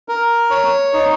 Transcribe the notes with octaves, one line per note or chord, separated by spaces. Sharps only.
A#4
C#5
D#4